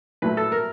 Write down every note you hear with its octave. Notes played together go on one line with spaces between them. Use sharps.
A#2 F#3 A3 B4
A4
A#4